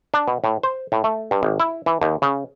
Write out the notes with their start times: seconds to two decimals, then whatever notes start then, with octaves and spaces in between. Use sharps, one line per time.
0.14 D4
0.28 B2
0.44 A2
0.63 C5
0.92 A2
1.04 A3
1.31 G2
1.43 G#1
1.60 E4
1.86 E3
2.02 D#2
2.22 C#3